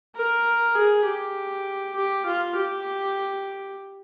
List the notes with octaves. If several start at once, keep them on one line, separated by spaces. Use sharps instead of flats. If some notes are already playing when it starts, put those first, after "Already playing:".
A#4
G#4
G4
G4
F4
G4